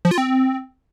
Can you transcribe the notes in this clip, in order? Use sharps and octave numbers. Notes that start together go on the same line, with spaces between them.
F3
F4
C4